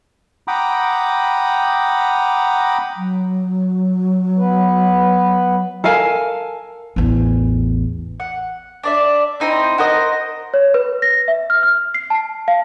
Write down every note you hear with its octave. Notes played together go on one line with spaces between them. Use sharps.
F#5 G5 A#5 B5 D6 D#6
F#3
B3 B4
A4 A#4 F5 G#5
A1 E2
F#5
D4 D5 E5
C4 D#4 E4 C5
F#4 A#4 C5 D#5
C#5
B4
A#6
E5
F6
F6
C7
A5
F5